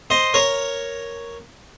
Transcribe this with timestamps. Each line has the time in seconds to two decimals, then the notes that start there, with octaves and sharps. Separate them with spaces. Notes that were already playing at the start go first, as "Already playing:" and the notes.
0.10 C5 D#5
0.34 A#4 C#5